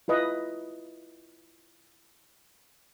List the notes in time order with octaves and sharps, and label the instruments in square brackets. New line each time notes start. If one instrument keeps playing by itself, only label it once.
[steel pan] E4 F4 B4 D#5